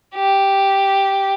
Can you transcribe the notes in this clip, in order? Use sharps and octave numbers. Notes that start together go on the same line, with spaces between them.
G4